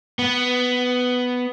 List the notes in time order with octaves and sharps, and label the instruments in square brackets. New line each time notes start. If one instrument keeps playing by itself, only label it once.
[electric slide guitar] B3